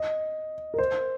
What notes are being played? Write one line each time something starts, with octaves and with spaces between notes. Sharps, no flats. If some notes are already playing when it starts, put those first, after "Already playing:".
Already playing: D#5
A#4
C5